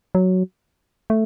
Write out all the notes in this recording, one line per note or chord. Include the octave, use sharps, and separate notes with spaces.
F#3
A3